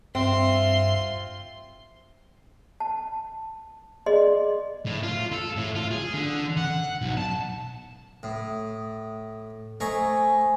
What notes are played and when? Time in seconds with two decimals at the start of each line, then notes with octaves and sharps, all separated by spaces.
0.15 G2 C4 F4 E5 C6
2.80 A5
4.06 G#4 D5 D#5 C6
4.86 A2
5.03 F4
5.32 A4
5.57 A2
5.75 F4
5.91 G#4
6.13 D3
6.57 F#5
7.01 B1
7.17 A5
8.23 A2 D#6
9.80 A3 C5 C#5 D#5 G#5 A#5